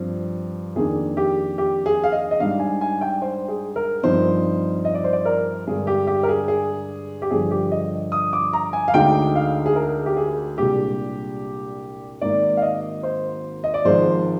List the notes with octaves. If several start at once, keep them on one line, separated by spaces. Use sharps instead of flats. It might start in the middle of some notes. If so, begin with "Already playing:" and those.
Already playing: G2 F3 C4
F2 D#3 A#3 D4 G#4
G4
G4
G#4
F5
D#5
D#5
G#2 G3 D4 F5
G#5
G#5
G5
C5
G#4
A#4
G2 F3 C4 D#4 C5
D#5
D5
C5
D5
A#4
G2 D3 G#3 G#4
G4
G4
A#4
G#4
G#4
G4
G2 D3 F3 G#4
G4
D#5
D#6
D6
A#5
G#5
F5
D2 D3 G#3 D#4 G5
F5
G#4
A#4
G4
G#4
C2 A#2 G#3 D4 G4
G#1 G#2 D#3 A#3 D5
F5
D#5
C5
D#5
D5
G#1 G#2 F3 G#3 C5